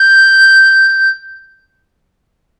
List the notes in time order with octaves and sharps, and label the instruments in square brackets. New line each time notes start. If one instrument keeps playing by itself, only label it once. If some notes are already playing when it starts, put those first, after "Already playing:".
Already playing: [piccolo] G6